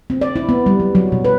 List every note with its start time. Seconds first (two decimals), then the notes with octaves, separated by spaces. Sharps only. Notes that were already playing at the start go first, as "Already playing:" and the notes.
0.10 C4
0.21 D5
0.36 E4
0.49 B3
0.66 G3
0.80 F#3
0.95 F#3
1.12 B2
1.25 B4